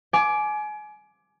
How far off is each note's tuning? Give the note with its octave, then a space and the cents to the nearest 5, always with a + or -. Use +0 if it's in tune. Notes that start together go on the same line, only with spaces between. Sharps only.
G#5 +30 D6 +0